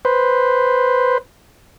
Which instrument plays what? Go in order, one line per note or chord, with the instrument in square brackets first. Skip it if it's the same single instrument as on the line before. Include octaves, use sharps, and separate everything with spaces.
[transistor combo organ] B4 C5